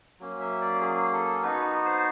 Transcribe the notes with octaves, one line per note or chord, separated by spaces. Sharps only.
F#3 A#3 C#4
E5
D5
G#4
A4
B3 D#4 F#4 B4
C5